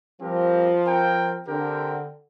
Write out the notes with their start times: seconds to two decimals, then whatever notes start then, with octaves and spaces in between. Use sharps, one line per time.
0.21 F3 G3 C4 G4 A#4
0.84 C4 A#4 G5
1.47 D3 C4 G4 A#4 G5